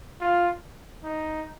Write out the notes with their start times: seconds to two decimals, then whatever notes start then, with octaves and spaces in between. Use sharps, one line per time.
0.20 F4
1.04 D#4